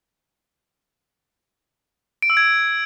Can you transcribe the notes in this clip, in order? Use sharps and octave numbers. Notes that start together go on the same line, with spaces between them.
D7
E6
G#6